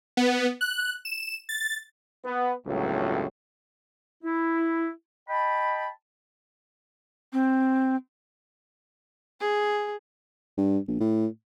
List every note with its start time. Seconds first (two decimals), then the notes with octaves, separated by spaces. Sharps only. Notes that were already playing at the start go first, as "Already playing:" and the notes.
0.17 B3
0.61 F#6
1.05 E7
1.49 A6
2.25 B3
2.66 G1 C#2 A2 F#3
4.24 E4
5.29 D#5 G5 A5 B5
7.33 C4
9.40 G#4
10.57 G2
10.88 A#1
11.00 A2